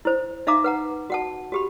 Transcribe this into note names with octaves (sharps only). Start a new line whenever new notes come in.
E4 C5
D#4 E5 F5 A#5 D6
B4 F#5 A#5
F#4 F#5 A5
F#4 G4 B5